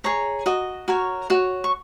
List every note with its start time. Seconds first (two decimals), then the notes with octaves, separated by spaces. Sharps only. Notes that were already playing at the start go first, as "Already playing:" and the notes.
0.04 G#4 C#5 A#5
0.46 F#4 D#5
0.88 F#4 A#4 C#5
1.30 F#4 C#5
1.64 C#6